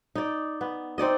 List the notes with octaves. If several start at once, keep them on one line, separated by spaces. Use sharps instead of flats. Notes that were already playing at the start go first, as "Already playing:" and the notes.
D#4 D5
B3
C4 D#4 D5 D#5